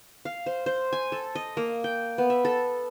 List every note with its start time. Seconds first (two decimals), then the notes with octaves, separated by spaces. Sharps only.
0.25 F5
0.46 C5
0.66 C5
0.93 G#5
1.12 A4
1.35 D#5
1.57 A#3
1.84 G5
2.18 B3
2.30 E5
2.45 A4